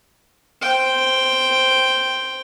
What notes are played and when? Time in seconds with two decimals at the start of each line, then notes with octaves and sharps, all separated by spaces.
0.62 C5 G5